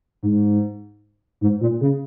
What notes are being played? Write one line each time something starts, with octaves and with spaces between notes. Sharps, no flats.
G#2
G#2
A#2
C#3